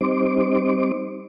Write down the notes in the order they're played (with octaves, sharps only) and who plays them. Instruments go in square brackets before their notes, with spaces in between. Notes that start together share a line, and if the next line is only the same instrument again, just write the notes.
[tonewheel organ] G3 C4 D#4 C5 D6